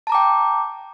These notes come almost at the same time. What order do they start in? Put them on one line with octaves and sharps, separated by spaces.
A5 A#5 D6 G5